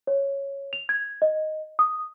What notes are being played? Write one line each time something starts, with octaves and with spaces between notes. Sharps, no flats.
C#5
F7
G#6
D#5
D#6